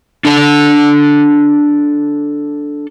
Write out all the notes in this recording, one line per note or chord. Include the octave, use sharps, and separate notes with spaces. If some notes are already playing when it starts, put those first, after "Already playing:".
D4 A4 A5